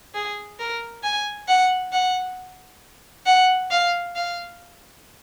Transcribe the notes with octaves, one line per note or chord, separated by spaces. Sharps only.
G#4
A#4
G#5
F#5
F#5
F#5
F5
F5